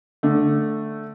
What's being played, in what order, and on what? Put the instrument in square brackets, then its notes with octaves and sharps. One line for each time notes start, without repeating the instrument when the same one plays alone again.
[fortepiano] D3 A3